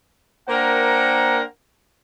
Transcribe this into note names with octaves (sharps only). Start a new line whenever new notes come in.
A#3 D4 A#4 C5 F#5 G5